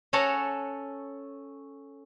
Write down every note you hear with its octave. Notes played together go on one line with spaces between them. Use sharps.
C#4 A4 C#5 F#5 A5 A#5